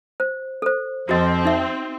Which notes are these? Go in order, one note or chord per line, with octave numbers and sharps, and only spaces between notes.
C5
A4 C5
F2 F3 C4 F#4 D#5
D#4 E5